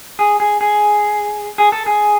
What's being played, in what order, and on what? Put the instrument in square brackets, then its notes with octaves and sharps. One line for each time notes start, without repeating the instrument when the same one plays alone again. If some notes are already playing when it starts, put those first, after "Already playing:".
[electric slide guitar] G#4
G#4
G#4
G#4
A4
G#4